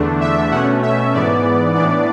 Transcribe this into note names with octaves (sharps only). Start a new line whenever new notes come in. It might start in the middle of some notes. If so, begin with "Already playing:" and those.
Already playing: E2 D3 A3 D4
E5
B2 A3 C#4 F#5
E5
G#2 E3 B3 D5
A2 E3 B3 D4 D5